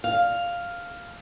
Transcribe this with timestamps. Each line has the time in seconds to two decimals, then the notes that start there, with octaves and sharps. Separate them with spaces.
0.04 F5